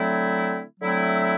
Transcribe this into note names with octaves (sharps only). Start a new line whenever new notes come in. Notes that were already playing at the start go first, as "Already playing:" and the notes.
Already playing: D3 F#3 A3 C4 E4
D3 F#3 A3 C4 E4